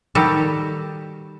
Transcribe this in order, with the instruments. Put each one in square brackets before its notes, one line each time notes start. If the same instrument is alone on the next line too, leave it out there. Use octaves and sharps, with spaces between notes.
[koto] D#3 G3 F#4 G4 A4